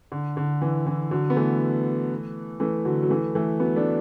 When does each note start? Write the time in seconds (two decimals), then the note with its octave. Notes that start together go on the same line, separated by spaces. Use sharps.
0.12 D3
0.37 D3
0.62 E3
0.86 E3
1.11 D3 F#3
1.30 B3
1.36 E3 A3
2.60 E3 A3
2.85 D3 F#3
3.03 F#3
3.10 E3 A3
3.35 E3 A3
3.60 F#3 B3
3.76 A3 D4